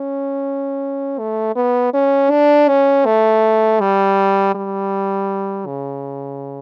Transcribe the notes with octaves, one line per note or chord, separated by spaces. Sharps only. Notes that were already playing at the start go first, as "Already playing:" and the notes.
Already playing: C#4
A3
B3
C#4
D4
C#4
A3
G3
G3
C#3